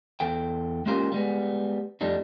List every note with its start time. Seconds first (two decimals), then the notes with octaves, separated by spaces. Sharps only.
0.20 E2 A4 G5
0.86 G#3 A#3 C#4 F4 G4 A#4
1.12 G3 G#3 B3
2.01 F2 G3 A3 D4 D#4